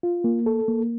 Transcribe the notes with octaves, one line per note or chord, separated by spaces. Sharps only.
F4
A#3
A4
A#3